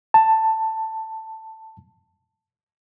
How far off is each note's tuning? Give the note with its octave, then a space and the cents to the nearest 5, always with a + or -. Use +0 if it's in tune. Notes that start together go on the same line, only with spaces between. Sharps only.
A5 +10